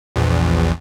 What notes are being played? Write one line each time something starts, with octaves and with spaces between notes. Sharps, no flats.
A#1 E2